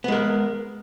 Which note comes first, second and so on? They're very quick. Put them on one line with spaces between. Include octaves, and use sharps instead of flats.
B3 G#3 A#4